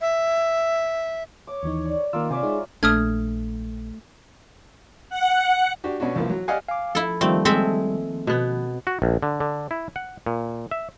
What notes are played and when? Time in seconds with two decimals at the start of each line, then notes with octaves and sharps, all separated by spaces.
0.01 E5
1.47 C#5 D6
1.63 D#2 E3 D#4
1.85 D5
2.13 D#3 A#3 F4 A#4 D6 E6
2.30 C3 C#5 D5 E5 G#5 D6
2.43 G#3 D#4 G#4
2.83 A#1 A3 D4 D#6 F6 G#6
5.09 F#5
5.84 D4 F#4 G4
6.00 B2 C#4 D4 F#4
6.16 C2 E3 F3 A#3
6.30 F#3
6.48 G4 D5 D#5 F5 F#5 G#5
6.68 F5 G#5 D6
6.95 F3 E4 A4
7.21 D#3 F3 G3 A3 A#3 C4
7.45 G#3 C4 A4 E5
8.27 B2 B3 D#5
8.87 F#4
9.02 A#1
9.23 D3
9.40 D3
9.71 E4
9.96 F#5
10.26 A#2
10.71 E5